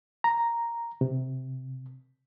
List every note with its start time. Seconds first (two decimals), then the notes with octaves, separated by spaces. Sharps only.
0.24 A#5
1.01 C3